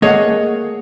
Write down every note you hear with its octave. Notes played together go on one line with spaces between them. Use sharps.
A3 A#3 G#4 C#5 D#5 F#5